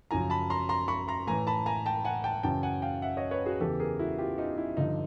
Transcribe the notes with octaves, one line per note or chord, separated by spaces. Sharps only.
F#2 C#3 F3 G#5 A#5
A5 B5
A#5 C6
A#5 C6
B5 C#6
A#5 C6
A2 E3 G#5 A#5
A5 B5
G#5 A#5
G5 A5
F#5 G#5
G5 A5
F#2 C#3 E3 G5 A5
F#5 G#5
F5 G5
E5 F#5
C#5 D#5
B4 C#5
F#4 G#4
E2 C#3 E3 G4 A4
G#4 A#4
E4 F#4
F4 G4
D#4 F4
E4
G2 D3 F3 D#4